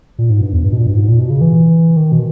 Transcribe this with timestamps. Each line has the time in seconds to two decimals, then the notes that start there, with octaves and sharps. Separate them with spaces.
0.19 A#2
0.30 G#2
0.41 G2
0.53 E2
0.64 G2
0.73 B2
0.78 A#2
0.87 G2
0.94 G#2
1.08 A#2
1.19 B2
1.30 C#3
1.41 E3
1.97 D#3
2.12 B2